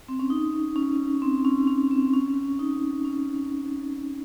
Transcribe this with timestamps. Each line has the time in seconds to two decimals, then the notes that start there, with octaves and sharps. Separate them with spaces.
0.08 C4
0.19 C#4
0.30 D#4
0.76 C#4
1.22 C4
1.45 C#4
1.67 C#4
1.91 C4
2.14 C#4
2.59 D#4
3.05 C#4